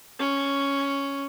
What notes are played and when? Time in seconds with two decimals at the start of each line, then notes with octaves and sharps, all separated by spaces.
0.19 C#4